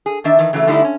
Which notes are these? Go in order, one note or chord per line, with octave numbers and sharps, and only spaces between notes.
G#4
E2 D#3 D4 E5
D#3 E3
C#3 E3 F#3 A3
D3 G3 A3 D#4 E4
C#4